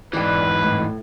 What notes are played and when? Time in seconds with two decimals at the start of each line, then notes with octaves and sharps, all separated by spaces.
0.13 G#2 E3 B4 D5 G5
0.63 A2